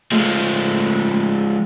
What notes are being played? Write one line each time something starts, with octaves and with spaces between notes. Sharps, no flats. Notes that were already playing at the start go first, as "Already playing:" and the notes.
F3 G#3 A3